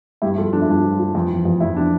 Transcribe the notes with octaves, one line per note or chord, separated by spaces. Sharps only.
G2 E4 G4
F3 F4 A4
F3 D4
E4
G2 D4
F3
F3
F2
E3
F2
F2 E4
D4